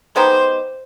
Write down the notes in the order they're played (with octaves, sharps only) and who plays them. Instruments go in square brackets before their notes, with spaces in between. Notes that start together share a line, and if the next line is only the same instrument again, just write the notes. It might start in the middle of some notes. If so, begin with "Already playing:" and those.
[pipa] G#3 B3 D#4 G4 [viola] C5